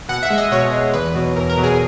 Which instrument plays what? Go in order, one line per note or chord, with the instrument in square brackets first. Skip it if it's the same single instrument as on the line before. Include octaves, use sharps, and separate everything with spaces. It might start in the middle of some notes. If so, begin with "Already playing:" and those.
[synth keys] B2 F#5
E5
G#3
D#5
B2 C#5
G#3
E2 B4
B2 F#3
E2 A#4
A#4
B2 F#3
G#4